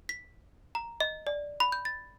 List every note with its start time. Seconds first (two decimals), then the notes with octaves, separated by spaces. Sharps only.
0.09 B6
0.75 A#5
1.00 D#5
1.27 D5
1.60 B5
1.72 G6
1.85 A6